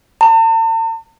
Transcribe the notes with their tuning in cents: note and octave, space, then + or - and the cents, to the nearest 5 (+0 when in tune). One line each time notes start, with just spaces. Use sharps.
A5 +45